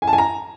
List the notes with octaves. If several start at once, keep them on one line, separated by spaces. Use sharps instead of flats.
G#5
A5
G#5
A#5